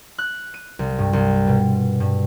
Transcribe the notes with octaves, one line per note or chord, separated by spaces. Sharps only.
F#6
D#7
C2
G2
C2
B2
G2